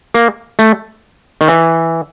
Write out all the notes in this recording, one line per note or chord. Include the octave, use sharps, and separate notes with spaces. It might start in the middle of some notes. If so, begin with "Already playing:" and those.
A#3
A3
D#3
E3